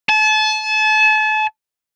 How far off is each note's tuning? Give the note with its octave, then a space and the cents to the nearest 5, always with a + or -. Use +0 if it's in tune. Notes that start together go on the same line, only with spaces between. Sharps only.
A5 -35